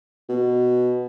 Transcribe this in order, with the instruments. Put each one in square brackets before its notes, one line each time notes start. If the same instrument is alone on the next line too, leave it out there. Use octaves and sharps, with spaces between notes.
[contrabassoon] B2